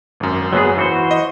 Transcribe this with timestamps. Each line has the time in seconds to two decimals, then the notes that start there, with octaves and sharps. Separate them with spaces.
0.20 G#1 F#2
0.53 F#3 B3 G#4
0.77 E3 F#4 C5
1.11 D#5